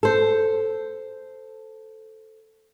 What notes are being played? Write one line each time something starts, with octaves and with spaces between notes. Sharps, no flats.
A4 C5